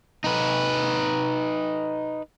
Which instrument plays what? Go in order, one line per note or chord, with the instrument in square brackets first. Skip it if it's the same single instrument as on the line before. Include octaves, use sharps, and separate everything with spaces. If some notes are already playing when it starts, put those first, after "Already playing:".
[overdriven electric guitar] D#4 B4